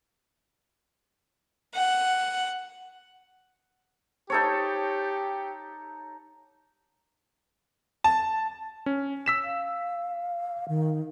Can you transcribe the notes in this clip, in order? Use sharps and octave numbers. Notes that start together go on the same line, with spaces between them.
F#5
D#4 G4 A4 C#5
A5
C#4
E6 B6 E7
F5
D#3